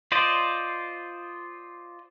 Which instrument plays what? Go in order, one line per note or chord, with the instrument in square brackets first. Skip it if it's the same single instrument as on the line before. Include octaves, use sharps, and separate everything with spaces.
[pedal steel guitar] F4 C5 D5 D#5